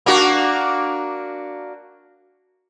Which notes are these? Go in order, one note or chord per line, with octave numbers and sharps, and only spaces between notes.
A#3 D4 F#4